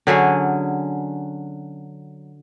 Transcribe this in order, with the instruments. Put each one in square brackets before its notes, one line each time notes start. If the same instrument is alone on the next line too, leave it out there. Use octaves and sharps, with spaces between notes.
[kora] D3 F#3 C#4 G#4